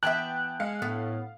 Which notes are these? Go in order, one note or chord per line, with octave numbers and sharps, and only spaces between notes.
E3 B3 E5 G5 A5 F#6
G#3 F5 C#7
A2 B3